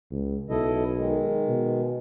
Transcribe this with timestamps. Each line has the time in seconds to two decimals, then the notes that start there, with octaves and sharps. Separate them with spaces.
0.11 C#2
0.50 B1 E4 A4 D#5
0.98 D#3 G#3
1.48 B2